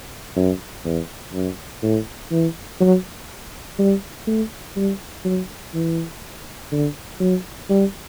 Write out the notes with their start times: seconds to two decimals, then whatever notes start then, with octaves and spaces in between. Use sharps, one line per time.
0.36 F#2
0.85 E2
1.33 F#2
1.83 A2
2.31 E3
2.80 F#3
3.79 G3
4.27 A3
4.76 G3
5.25 F#3
5.74 E3
6.72 D3
7.20 F#3
7.70 G3